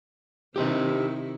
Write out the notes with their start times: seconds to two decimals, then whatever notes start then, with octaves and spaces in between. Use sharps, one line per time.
0.56 C3 D#3 E4 G4 C5 D#5